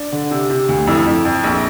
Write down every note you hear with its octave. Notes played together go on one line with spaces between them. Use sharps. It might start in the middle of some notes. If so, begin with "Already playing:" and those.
Already playing: D4
D3
C3
C3
D2
F2 E4
F2
F2
A#1